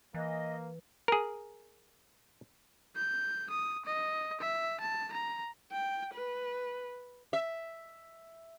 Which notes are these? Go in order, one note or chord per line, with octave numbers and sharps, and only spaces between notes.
E3 A#3 D#5
G#4 A#4
G6
D#6
D#5
E5
A5
A#5
G5
B4
E5